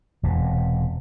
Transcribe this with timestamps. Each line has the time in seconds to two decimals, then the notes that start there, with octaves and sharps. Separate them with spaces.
0.23 E1 C3